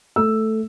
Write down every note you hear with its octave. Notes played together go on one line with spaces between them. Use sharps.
A3 E6